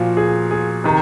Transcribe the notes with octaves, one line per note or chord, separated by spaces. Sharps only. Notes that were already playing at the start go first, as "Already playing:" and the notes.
Already playing: A#2 F3 F#4
G#4
G#4
C3 D#3